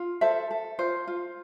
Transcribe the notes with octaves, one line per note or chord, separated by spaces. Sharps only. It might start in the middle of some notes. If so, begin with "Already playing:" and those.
Already playing: F4
A4 C5 E5
A4
F4 C5
F4